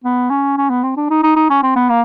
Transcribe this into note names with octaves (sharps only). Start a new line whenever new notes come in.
B3
C#4
C#4
B3
C4
D4
D#4
D#4
D#4
C#4
C4
B3
A#3